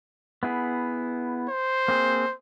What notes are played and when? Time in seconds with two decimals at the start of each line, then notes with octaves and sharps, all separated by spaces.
0.43 B3 E4 G#4
1.49 C5
1.88 A#3 C4 G#4